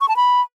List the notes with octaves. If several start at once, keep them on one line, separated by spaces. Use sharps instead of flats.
C#6
A5
B5